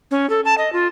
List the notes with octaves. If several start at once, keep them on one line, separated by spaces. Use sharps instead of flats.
C#4
A4
A5
D#5
F4